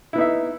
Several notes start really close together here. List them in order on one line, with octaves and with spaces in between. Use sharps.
E4 B3 D#4 E5